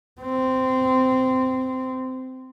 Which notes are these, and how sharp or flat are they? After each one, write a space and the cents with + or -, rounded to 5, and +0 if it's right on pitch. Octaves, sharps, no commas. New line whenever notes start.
C4 -15